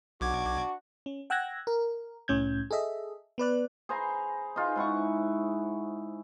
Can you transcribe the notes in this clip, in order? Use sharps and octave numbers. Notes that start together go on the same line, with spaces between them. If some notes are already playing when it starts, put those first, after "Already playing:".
B1 D4 F#4 D6 G#6
C#4
F#5 G5 E6 F#6 G#6 A#6
A#4
C2 A2 C#4 G6 G#6
G#4 A4 D#5 E5
B3 B4 D5 F#6
G#4 C5 A#5 B5
D#4 F4 G#4
G#2 E4 F#5 C#6